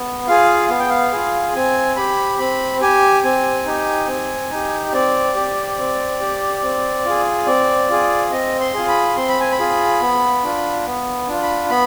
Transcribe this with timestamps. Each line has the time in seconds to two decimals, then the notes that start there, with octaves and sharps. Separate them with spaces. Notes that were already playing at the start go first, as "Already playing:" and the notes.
Already playing: B3
0.27 F4 G#4 F5
0.69 B3 F5
0.80 G5
0.89 F5
1.12 F4 G#4
1.55 C4 G#5
1.96 G4 B5
2.38 C4 B5
2.81 G4 G#5
3.24 C4 G#5
3.66 D#4 G4
4.08 C4
4.51 D#4 G4
4.93 C4 D5
5.35 G4
5.78 C4
6.20 G4
6.63 C4
7.05 F4 G#4
7.47 C4 D5
7.90 F4 G#4
8.31 C4 D#5
8.60 C6
8.74 F4 G#4
8.88 B5
9.16 C4 C6
9.28 B5
9.40 G#5
9.52 B5
9.59 F4 G#4
10.01 B3
10.44 D4 F4
10.86 B3
11.28 D4 F4
11.43 B5
11.70 B3 B5